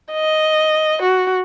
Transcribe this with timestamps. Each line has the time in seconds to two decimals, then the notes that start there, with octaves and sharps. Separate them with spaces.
0.12 D#5
1.02 F#4